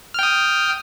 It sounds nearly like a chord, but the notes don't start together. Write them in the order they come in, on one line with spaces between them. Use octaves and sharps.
F6 G5 D#6